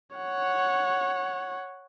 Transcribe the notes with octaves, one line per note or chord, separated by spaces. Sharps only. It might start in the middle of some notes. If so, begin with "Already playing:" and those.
C#5 F#5